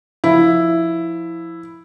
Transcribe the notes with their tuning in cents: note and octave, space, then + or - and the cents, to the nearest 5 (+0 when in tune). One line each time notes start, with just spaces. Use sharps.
F3 +0 E4 +0